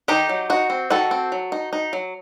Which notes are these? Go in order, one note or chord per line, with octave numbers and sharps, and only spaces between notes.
D#3 D#4 G4
F#3
D#4 F#4
C4
D#3 F#4 A4
C4
F#3
D#4
D#4
F#3